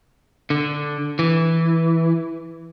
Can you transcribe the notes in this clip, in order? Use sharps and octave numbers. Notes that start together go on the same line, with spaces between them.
D3
E3